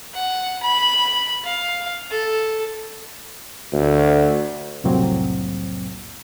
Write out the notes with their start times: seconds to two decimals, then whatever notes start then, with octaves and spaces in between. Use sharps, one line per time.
0.14 F#5
0.62 B5
1.44 F5
2.10 A4
3.73 D2
4.84 C2 F2 A2 F#3 A#3 C4